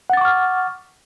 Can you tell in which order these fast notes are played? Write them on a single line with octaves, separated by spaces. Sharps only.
F#5 A6 D6 C#6 F6